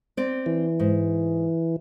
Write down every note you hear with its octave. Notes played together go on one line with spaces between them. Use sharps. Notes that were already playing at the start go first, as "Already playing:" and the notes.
C4 D5
E3
G#2